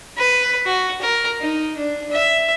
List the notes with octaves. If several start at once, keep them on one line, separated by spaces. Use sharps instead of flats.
B4
F#4
A#4
D#4
D4
E5